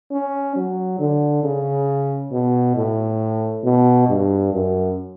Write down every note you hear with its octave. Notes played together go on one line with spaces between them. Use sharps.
C#4
F#3
D3
C#3
B2
A2
B2
G2
F#2